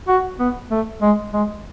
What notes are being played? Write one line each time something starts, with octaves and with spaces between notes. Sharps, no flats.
F#4
B3
A3
G#3
G#3